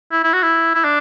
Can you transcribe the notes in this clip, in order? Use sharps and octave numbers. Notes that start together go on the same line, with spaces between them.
E4
E4
F#4
E4
E4
D4